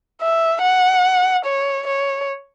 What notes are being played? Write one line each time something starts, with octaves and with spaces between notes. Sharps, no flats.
E5
F#5
C#5
C#5